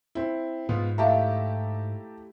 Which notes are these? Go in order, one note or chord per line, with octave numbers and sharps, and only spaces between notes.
C4 E4
G#2 G#3 B3 F4
A3 E4 G4 E5 F5 A5 A#5